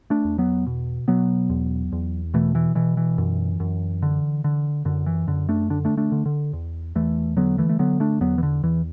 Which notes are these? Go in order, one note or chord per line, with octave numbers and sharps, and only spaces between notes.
A3 D4
E2
F#3 B3
B2
B2 F#3 B3
E2
E2
B2 E3 A3
E3
B2 E3
E3
F#2
F#2
D3
D3
F#2 D3
E3
F#2 D3
A3 D4
D3 D4
A3 D4
A3 D4
D3
D3
E2
E2 E3 A3
D3 F#3 B3
E3 A3
A3
D3 F#3 B3
A3 D4
E2 F#3 B3
E3
D3
E2 E3